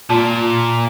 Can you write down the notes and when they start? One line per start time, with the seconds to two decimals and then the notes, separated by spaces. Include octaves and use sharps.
0.10 A#2 F4 A5